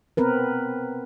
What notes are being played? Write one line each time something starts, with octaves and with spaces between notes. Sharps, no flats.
B3 C4 A#4 B4